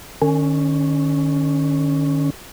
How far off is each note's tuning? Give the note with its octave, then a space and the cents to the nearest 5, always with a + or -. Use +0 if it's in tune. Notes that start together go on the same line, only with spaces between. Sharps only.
D#3 -40 C#4 +0